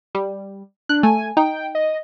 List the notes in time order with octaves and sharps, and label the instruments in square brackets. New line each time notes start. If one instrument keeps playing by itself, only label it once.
[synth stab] G3
[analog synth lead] D4 [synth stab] F#6
[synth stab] A3 [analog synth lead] G#5
[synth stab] D#4 [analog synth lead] G5
[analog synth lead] D#5